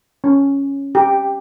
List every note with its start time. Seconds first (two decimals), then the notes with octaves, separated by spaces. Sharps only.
0.24 C#4
0.95 G4